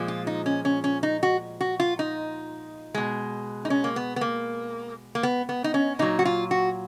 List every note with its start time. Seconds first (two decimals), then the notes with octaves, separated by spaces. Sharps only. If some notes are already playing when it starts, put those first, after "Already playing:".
Already playing: A#2 F3 G#3
0.08 F4
0.27 D#4
0.46 C#4
0.65 C#4
0.84 C#4
1.03 D#4
1.23 F#4
1.61 F#4
1.80 F4
1.99 D#4
2.94 B2 G#3
3.65 D#4
3.70 C#4
3.84 A#3
3.96 B3
4.16 B3
4.21 A#3
5.15 A#3
5.23 B3
5.49 B3
5.64 D#4
5.74 C#4
5.99 A#2 F#3 D#4
6.19 F#4
6.25 F4
6.51 F#4